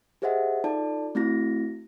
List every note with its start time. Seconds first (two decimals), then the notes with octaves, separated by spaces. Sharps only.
0.22 G4 G#4 C5 D#5 E5 F#5
0.64 D#4 F4 A4 D5 A5
1.15 A3 C4 E4 F#4 A#6